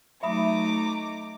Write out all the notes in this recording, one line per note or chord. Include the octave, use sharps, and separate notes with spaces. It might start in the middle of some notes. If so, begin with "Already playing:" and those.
F#3 A3 D#4 E5 A#5 B5 D6 D#6